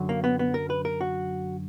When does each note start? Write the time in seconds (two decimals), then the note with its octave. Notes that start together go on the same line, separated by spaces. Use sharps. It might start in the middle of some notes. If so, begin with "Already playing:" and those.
Already playing: F#2 D3 F#3
0.09 A#3
0.24 B3
0.39 B3
0.54 A#4
0.70 B4
0.85 A#4
1.01 F#4